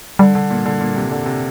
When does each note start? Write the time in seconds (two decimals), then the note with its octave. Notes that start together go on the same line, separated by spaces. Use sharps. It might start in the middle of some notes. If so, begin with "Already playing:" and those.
0.19 D3 G3
0.35 D3
0.50 A#2
0.66 D3
0.81 A#2
0.96 C3
1.11 D3
1.26 C3